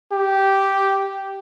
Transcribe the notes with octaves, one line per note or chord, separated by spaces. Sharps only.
G4